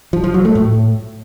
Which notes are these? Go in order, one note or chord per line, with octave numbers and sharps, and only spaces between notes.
F3
F3
F#3
A3
A2